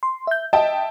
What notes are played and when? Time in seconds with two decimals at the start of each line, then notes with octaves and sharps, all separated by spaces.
0.03 C6
0.27 E5 G6
0.53 D#5 E5 G5 A5